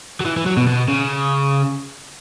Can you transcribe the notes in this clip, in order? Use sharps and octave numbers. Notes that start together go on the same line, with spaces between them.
F#3
E3
E3
F#3
B2
B2
C#3